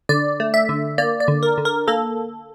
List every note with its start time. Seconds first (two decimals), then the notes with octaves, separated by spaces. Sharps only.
0.09 D3 D5
0.40 A3
0.54 E5
0.69 D3
0.98 A#3 D5
1.20 D5
1.28 D3
1.43 A#4
1.58 D3
1.65 A#4
1.88 A#3 A4